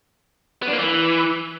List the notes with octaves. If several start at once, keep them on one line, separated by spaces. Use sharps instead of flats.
B3
D4
A#3
E3